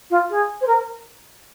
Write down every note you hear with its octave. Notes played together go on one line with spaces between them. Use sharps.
F4
G#4
C5
A#4